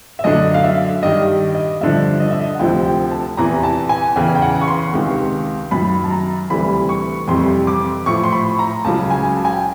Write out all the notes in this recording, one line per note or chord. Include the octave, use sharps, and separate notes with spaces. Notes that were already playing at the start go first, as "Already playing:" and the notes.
E5
F#2 D3 F#3 D#5
F5
E5
G2 D#3 G3 D#5
D#5
G2 D3 F3 E5
D#5
E5
D#5
F#5
D2 C3 F3 G5
G5
A5
E2 C3 E3 A#5
A5
G#5
E2 C#3 E3 G5
G5
F#5
C#6
C6
C#2 C3 D#3
F#2 D#3 F#3 B5
A5
A#5
D2 C3 E3 G3 B5
C#6
F2 C3 E3 G3 C6
D6
A2 F3 C#6
C6
B5
A#5
C#2 C#3 F#3 A5
G#5
A5
G#5
G5